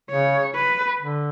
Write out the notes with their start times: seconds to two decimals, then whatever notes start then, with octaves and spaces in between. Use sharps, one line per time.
0.10 C#3 C#5
0.55 B4
0.98 D3